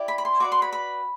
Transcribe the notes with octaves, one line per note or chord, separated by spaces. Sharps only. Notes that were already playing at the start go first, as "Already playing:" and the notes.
Already playing: E4 G4 D5
B5
B5
C6
F#4 B4 D5 D6
C6
B5
B5